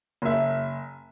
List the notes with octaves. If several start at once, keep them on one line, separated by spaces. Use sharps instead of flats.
F#1 E5